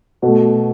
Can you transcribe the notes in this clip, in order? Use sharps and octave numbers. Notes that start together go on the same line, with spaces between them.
B2 A3 F#4 A4